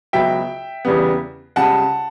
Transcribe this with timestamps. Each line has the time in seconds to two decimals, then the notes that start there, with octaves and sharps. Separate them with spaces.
0.13 C#2 B2 F#3 B3 E5 G5
0.85 E2 C#3 G3 B3
1.56 C#2 C#3 G3 F#5 A5